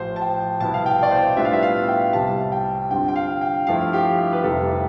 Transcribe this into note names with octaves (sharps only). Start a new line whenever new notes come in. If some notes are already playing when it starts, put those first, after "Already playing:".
Already playing: A1 A2 F3 C5
A5
G5
C2 B2 B3 E4 A5
F5
G5
D5
C5
A2 G3 B3 D4 F4 E5
F5
E5
F5
G5
C2 C3 G3 A5
G5
G2 D3 G3 C4 F4 G5
G5
F5
G5
G2 F3 A3 E4 F5
G4
G4
B4
F1 F2 C3 G3 A4